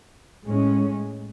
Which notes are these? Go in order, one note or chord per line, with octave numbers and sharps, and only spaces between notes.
A2 G#3 C#4